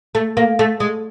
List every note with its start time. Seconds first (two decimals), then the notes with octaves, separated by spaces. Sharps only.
0.15 A3
0.37 A#3
0.59 A3
0.80 G#3